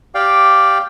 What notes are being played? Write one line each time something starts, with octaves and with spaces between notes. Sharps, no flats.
G4 D5 F5 G5